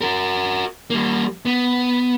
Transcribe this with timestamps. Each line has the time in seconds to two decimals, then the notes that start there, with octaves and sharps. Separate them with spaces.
0.01 F#4 A#4
0.90 G3 A#3
1.45 B3